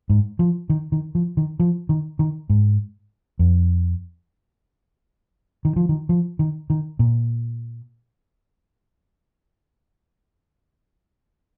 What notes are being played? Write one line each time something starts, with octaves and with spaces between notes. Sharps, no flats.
G#2
F3
D#3
D#3
F3
D#3
F3
D#3
D#3
G#2
F2
D#3
F3
D#3
F3
D#3
D#3
A#2